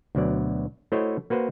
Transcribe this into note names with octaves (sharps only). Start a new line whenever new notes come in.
D2 B2 F#3 D5
A3 E4 F#4 C5 C#5 D#5
A#3 F#4 B4 C5